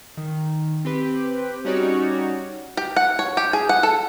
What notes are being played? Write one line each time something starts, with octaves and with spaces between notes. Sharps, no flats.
D#3
C4 G4 B4
G3 C#4 D#4 F#4 C#5 D5
G4
F#5
C#5
G4
G#4
F#5
A4